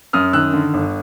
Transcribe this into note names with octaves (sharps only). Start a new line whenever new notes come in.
F#2 D#6 F6
D#3 E6 F#6
D3
G1